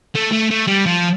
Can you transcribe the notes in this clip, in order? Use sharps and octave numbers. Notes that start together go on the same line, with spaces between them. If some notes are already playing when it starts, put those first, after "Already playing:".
A3
A3
A3
G3
F3